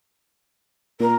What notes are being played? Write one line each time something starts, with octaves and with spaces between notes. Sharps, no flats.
A#2 A#4